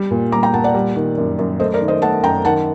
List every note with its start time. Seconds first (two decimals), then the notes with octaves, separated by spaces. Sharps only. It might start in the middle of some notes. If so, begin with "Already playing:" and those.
Already playing: G3
0.11 A#2
0.32 G3 A#5 D6
0.43 G5 A#5
0.53 A#2 F#5 A5
0.64 D5 F#5
0.74 G3
0.96 D#3
1.17 F#2
1.39 F#2
1.60 A3 C5 D#5
1.74 A#4 D5
1.81 D#3
1.88 C5 D#5
2.02 A3 F#5 A5
2.23 F#2 G5 A#5
2.45 D#3 F#5 A5